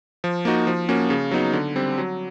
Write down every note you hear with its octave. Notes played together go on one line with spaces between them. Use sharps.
F3
A#3 D#4 F#4
F3
A#3 C#4 F#4
C#3
F#3 B3 D#4 F#4
D3
G3 C4
F#3